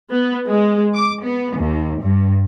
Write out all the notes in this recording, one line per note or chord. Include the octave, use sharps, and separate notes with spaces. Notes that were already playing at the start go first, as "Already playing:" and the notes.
B3
G#3
D6
B3
D#2
G2